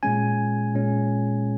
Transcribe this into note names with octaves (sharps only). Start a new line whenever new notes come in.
A#2 G#3 C#4 G#5
A#2 G#3 C#4